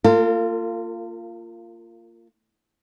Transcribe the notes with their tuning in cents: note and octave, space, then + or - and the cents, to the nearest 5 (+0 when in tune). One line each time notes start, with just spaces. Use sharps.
A#3 -25 F4 -15 A4 +45